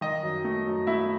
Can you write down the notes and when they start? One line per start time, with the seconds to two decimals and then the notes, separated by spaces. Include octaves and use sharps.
0.01 D#3 D#5
0.23 F#2
0.44 A3
0.66 F#2
0.87 A3 E4 E5